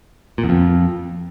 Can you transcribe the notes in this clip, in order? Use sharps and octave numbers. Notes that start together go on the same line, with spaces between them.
A#2
E2
F2